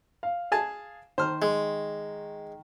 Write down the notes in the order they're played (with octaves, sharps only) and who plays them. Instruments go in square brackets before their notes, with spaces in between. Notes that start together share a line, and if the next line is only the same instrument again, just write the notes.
[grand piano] F5
[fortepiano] G#4 G#5 A5
[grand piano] D#3 [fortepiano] C5 F6
[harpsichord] G#3